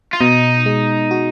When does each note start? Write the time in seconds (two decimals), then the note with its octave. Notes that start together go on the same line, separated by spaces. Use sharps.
0.13 F4
0.20 B2 D#4
0.66 G#3
1.11 F#4